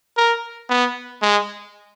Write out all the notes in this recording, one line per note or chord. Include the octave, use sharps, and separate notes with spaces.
A#4
B3
G#3